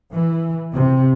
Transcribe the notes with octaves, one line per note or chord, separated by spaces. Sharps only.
E3
C3